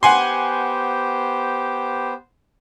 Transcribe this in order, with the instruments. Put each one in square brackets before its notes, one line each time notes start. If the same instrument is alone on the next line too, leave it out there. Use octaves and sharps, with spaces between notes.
[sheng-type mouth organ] B3 C5 [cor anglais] G4 [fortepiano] F#5 G#5 C6